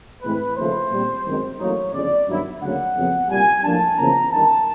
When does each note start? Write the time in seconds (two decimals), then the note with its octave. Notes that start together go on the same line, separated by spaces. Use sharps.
0.23 A2 E3 G#3 C4 B4
0.57 D#2 C#3 F3 A3 C5
0.91 A#2 G3 C4
1.25 G#1 F#2 D#3 G#3 C4
1.59 A1 A2 F#3 A#3 D#4 C#5
1.93 G1 F2 C#3 D5
2.28 G2 D#3 F#3 B3 E4
2.62 D2 C#3 F#3 A#3 C#4 F#5
2.96 F2 C#3 F#3 B3
3.29 C2 A#2 G3 G#5
3.64 A2 F3 A#3 D4 A5
3.98 E2 C#3 F3 A#3 C#4 A#5
4.32 G1 G2 D#3 A5